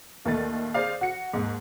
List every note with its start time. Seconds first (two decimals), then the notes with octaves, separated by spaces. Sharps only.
0.25 A#1 D#2 D#3 A3 A6
0.74 G#4 C5 D5 F5
1.01 F#4 C#7
1.33 D#2 G#2